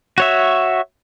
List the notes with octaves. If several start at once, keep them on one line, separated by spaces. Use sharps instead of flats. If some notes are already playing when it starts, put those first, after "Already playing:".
F#4 C#5 E5